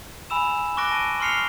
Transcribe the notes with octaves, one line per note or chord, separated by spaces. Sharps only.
G#5 B5 E6 E7
C#6 D6 F#6 A#6 D7
A5 D7
C6 C#6 F6 C7 C#7 F7